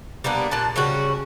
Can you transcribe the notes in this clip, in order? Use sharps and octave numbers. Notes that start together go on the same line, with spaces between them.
G3 A#3 B3 D4
A#2 D4 A5
C#3 G3 C#4 F#4